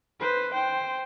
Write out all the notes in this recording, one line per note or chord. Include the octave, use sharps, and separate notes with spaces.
B4 C5
C5 G5